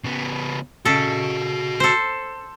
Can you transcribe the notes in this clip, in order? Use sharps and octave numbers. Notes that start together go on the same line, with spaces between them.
C#3 B3
C#3 F#4 A4 D#5
A4 C5